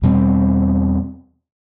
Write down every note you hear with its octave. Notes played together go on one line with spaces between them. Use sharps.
E2 B2 G3 C4